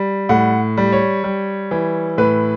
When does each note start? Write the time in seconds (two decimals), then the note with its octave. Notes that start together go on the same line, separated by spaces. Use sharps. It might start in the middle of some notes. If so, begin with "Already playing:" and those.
Already playing: G3
0.29 A2 F#5
0.77 G3
0.93 C#5
1.24 G3
1.71 E3
2.18 A2 B4